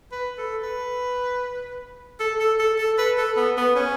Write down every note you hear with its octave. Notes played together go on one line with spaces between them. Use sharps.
B4
A4
B4
A4
A4
A4
A4
B4
A4
B3
B3
C#4